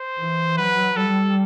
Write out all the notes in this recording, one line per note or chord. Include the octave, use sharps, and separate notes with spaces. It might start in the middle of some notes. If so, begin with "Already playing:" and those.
Already playing: C5
E3
F#3 B4
G3 A4